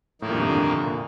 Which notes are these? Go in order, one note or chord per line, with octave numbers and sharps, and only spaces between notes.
F2 A2 D#3 A#3 D#4
G2 A#2
A2 C3
A#2 D3
A#2